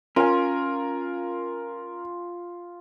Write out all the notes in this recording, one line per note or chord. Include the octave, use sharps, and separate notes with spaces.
C#4 F4 A#4 G#5